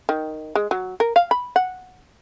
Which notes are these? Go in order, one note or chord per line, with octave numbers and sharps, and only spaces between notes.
D#3
G#3
F#3
A#4
F5
B5
F#5